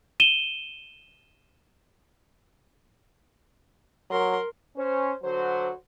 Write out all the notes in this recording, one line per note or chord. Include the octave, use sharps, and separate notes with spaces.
D#7 E7 G7
F#3 A#4 C6
C#4 C5
D3 F#3 F#4 C5